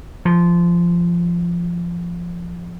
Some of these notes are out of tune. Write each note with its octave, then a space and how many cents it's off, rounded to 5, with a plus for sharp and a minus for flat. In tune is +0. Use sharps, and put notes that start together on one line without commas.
F3 -15